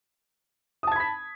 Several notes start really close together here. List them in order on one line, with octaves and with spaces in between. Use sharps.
D#6 A5 G#6 B5 B6